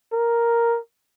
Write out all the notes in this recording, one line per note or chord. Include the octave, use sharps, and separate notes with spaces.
A#4